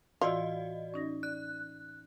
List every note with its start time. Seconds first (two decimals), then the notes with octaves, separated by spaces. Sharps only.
0.21 A2 E3 F4 F#4 D5 D#5 E6
0.94 C#4 D#4 A#6
1.23 D5 F#6